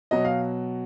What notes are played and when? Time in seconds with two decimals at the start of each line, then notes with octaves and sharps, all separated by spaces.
0.11 B2 F#3 D#5
0.25 F5